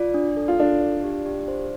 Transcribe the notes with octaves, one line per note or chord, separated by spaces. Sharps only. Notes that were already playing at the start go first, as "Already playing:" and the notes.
Already playing: F4 D5
D4
A4
F4
D4 A4
D5
G4
G4
C5